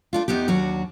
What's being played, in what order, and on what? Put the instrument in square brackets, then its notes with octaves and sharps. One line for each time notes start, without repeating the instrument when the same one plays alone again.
[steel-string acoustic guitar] A3 D4 F4
E2 B3 D#4 G4
D#2 F#3 D4 F#4